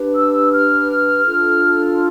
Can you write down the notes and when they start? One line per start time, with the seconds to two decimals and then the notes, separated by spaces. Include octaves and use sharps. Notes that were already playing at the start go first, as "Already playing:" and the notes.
Already playing: D4 G4 B4
0.16 E6
0.53 F6
1.26 D4 F4 A4